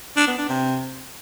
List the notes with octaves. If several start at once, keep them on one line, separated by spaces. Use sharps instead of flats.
D4
B3
D4
C3